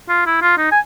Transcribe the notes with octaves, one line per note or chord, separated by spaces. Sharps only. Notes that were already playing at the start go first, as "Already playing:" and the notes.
F4
E4
F4
D#4
G#5